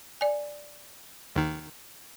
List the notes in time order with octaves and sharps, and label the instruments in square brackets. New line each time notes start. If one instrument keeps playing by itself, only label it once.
[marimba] D5 G#5
[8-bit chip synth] D#2 D#3